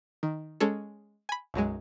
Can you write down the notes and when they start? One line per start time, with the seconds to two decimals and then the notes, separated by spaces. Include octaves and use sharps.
0.23 D#3
0.60 G#3 C#4 G#4 A4
1.29 G#5 B5
1.54 B1 F#2 F#3 G#3